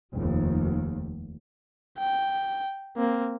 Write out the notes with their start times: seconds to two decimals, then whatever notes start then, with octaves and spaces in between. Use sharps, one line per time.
0.13 F1 D#2
1.98 G5
2.97 A#3 C4